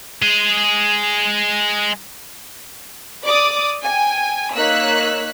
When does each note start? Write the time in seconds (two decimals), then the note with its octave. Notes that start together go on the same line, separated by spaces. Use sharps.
0.22 G#3 G#4
3.24 D5 D6 D#6
3.84 G5 G#5
4.56 A#3 D#4 C#5 E6 F#6 B6